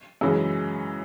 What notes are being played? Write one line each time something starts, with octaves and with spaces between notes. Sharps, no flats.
F#2 C#3 E3 G#3 C#4